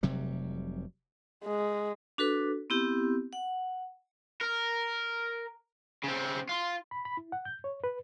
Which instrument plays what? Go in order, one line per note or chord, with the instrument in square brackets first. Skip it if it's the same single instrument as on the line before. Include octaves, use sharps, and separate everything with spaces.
[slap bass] F1 C3 F#3 G3
[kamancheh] G#3
[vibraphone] D4 F#4 A4 B4
B3 C4 E4 G4
F#5
[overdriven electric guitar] A#4
C#3 C4
F4
[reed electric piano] B5
B5
E4
F#5
G6
C#5
B4